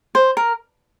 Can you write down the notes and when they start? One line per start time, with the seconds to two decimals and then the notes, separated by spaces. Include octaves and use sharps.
0.15 C5
0.37 A#4